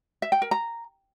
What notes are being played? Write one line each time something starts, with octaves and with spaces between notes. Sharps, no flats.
E5
G5
A#4
A#5